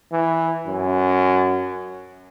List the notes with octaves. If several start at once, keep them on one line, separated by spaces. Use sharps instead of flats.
E3
F#2